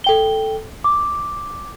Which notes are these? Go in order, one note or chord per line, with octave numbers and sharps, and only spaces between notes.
A4 G5 G7
D6